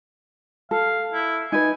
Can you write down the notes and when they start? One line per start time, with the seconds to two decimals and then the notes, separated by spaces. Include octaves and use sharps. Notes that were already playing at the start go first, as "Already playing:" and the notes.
0.71 A4 F5
1.13 E4
1.52 D#4 B4 G#5